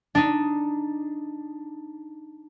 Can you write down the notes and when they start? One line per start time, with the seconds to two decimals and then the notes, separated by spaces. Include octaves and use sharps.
0.15 D4 D#4